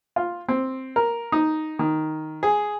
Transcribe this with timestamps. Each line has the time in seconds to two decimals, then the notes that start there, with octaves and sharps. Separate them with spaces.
0.16 F4
0.48 C4
0.96 A#4
1.32 D#4
1.79 D#3
2.43 G#4